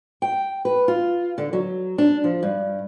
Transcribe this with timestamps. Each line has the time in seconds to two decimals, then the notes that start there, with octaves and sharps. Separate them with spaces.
0.22 G5
0.65 B4
0.88 F4
1.38 D3
1.53 F#3
1.98 D4
2.24 F3
2.43 G2